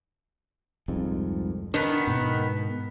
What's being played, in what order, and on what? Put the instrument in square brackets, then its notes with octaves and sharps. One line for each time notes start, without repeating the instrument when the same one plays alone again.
[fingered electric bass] C2 F2 G#2
[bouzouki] D#3 B3 [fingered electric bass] D4
[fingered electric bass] G#2 B2